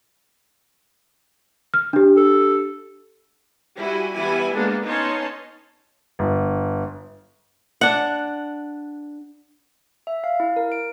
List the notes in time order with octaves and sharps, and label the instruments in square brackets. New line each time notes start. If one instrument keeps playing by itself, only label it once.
[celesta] F6
D4 G4
[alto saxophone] A4
[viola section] G3 E4 F#4 G#5
E3 G3 B3 E4 G#5
G#3 A#3 B3 D4 A4
B3 C#4 D#4 C#5 A5 C6
[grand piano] G1
[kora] D4 F#5
[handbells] E5
F5
E4
A#4
D7